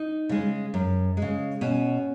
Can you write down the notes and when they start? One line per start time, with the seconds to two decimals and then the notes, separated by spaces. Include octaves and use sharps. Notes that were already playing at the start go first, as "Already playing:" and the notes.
Already playing: D#4
0.29 C#3 G#3
0.74 F#2
1.17 C#3 G#3
1.61 B2 C#4